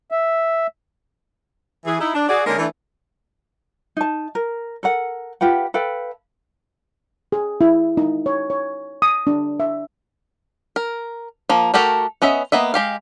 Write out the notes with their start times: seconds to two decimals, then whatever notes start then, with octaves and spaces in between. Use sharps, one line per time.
0.11 E5
1.85 E3 G#4
1.99 D#4 E4
2.14 D4
2.29 F#4 G#4 D5
2.45 D3 G#3 A#3 C#4 D#4 A#4
2.57 E3 A3 D4
3.97 D#4 A5
4.35 A#4
4.83 A4 A#4 F#5
5.41 F4 G4 B4 F#5
5.74 A4 B4 F5 G5
7.32 G#4
7.61 E4
7.97 D#4
8.26 C#5
8.50 C#5
9.02 D#6
9.27 D4
9.60 E5
10.76 A#4
11.49 F3 A#3
11.74 A3 F#4 G4 A4 A#4
12.22 B3 C#4 D#5 E5
12.52 A#3 B3 D#5 E5
12.74 G#3 G4 F5